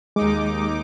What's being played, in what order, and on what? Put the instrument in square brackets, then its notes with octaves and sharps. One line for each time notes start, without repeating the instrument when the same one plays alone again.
[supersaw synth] D#2 D#4 D6 [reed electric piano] G#3